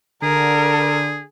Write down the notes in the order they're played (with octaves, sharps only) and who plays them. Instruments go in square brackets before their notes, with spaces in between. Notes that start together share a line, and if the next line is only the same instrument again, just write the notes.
[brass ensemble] D3 [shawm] G#4 [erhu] A#4